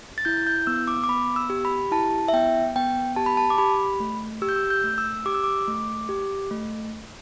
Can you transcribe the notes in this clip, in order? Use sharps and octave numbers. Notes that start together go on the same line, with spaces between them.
A6
E4 G6
G6
B3 E6
D6
D6
B3 B5
E6
G4
B5
E4 A5
E5
B3 G5
B3 G5
G4 A5
B5
A5
D6
G4 B5
A3
G4 E6
G6
E6
G6
A3
E6
G4 D6
E6
D6
A3
G4
A3